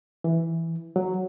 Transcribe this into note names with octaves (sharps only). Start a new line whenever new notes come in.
E3
F#3